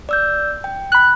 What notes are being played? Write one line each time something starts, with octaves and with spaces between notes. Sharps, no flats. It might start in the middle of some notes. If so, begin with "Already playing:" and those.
D5 E6 G6
G5
B5 F#6